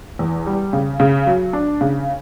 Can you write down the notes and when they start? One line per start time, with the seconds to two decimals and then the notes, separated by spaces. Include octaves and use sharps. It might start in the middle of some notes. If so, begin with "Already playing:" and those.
0.19 E2
0.46 G3
0.73 C#3
1.00 C#3
1.27 F#3
1.53 D4
1.81 C#3